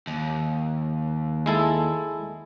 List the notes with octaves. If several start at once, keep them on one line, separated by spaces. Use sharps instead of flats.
D#2
G#3 E4 A4